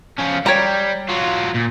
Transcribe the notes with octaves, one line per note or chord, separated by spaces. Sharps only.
F3 C#4
G3 C#5 G5 A#5
F#3 F4
A#2